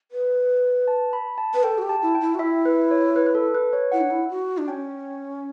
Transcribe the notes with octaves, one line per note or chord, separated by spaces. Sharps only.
B4
A5
B5
A5
B4
A4 G5
F#4
G4
A5
E4
G5
E4
F#4
E4 E5
B4
C#5
B4
B4
A4
B4
C#5
E4 F#5
D4
E4
F#4
D4
C#4 G5